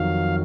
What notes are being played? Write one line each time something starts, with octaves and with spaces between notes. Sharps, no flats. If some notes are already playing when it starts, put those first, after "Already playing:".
Already playing: F2 D#3 F#3 F5